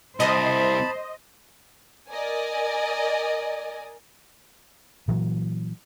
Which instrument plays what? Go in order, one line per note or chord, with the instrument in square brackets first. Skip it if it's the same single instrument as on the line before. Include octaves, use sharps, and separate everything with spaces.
[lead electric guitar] C2 [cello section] C5 [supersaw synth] D#5 [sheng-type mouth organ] A5 B5
[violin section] A#4 D5 D#5 G#5
[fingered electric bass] A#2 E3 F#3